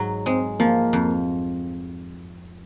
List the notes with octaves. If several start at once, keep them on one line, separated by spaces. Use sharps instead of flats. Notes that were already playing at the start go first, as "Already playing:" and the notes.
Already playing: G#2 F#3
G#3 C4
F3 A#3
F2